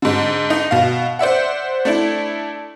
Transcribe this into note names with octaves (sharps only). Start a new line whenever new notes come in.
G#2 D3
D#4
B2 F5
C5 D5 E5 F#5
A3 D4 E4